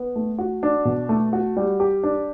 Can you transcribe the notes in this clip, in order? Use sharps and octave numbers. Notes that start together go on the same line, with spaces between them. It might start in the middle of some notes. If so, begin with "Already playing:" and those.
Already playing: B3
A3
F#4
D4
B2
A3
F#4
G3
G4
D4